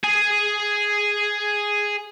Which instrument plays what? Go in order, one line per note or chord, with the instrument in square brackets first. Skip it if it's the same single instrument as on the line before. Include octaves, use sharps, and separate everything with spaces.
[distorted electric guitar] G#4 G#5